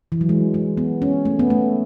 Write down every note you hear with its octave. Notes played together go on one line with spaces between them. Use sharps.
E3
F#3
G#3
G#3
B3
C#4
A3
B3
A3